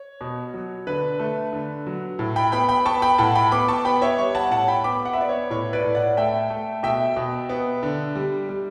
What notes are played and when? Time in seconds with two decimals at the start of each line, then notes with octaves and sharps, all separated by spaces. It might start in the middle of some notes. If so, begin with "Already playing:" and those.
Already playing: C#5
0.21 B2
0.54 F#3
0.87 D3 B4
1.19 A3
1.53 D3
1.86 F#3
2.19 A2
2.36 G5 B5
2.52 B3 G5 B5
2.69 G5 B5
2.85 B3 A5 C#6
3.02 G5 B5
3.18 A2 F#5 A5
3.35 G5 B5
3.51 B3 B5 D6
3.68 A5 C#6
3.85 B3 G5 B5
4.02 C#5 E5
4.18 G3 C#5
4.35 F#5 A5
4.51 A2 F#5 A5
4.68 G5 B5
4.84 B3 B5 D6
5.05 F#5
5.13 E5
5.18 B3 D5
5.29 C#5
5.50 A2 C#5
5.73 B4 D5
5.84 A2
5.95 D5 F#5
6.17 A3 E5 G5
6.50 A3
6.83 B2 E5 G5
7.16 B2
7.49 B3
7.83 D3
8.15 G3
8.49 G3